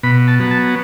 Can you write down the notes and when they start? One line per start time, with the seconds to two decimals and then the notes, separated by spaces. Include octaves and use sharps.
0.03 B2 B5
0.28 A5
0.39 F#3 B3
0.51 A5